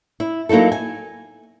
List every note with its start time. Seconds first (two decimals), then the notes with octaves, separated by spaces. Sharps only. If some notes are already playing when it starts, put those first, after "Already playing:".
0.20 E4
0.49 F#3 A#3 D#4 E4 A4
0.72 G#5